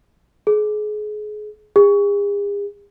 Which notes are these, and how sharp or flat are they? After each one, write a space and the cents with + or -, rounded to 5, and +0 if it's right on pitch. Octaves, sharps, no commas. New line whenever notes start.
G#4 +30
G#4 -40